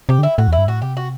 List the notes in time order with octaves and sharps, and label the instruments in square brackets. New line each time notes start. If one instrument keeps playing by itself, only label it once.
[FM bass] C3 [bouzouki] G4
[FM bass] D3
[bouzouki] E4
[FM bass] A2 [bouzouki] F#4
[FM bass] E2
[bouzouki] E4
[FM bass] G2
[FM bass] A2 [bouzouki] F#4
[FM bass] C3 [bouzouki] G4
[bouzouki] F#4